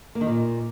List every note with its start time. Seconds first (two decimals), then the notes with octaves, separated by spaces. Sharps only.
0.15 A#3
0.21 D#3
0.27 A#2